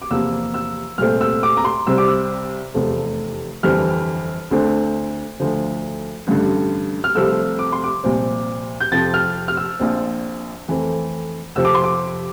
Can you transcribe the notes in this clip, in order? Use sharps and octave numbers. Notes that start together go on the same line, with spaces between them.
D6
E2 C3 F3 A#3 E6
E6
C2 A#2 A3 C4 F6
E6
D6
A#5
C6
C2 C3 G3 C4 E6
D6
E6
F1 E2 C3 F3 A3
G1 F2 E3 G3 C4 F6
D2 D3 A3 C4
D2 D3 F3
A1 G2 D3
F6
C2 C3 F3 A3 E6
D6
C6
D6
C2 A#2 F3 C4
G6
F2 C3 F3 C4 A6
F6
F6
E6
A#1 A#2 F3 C4
F2 E3 A3 C4
F2 C3 F3 E6
D6
C6
D6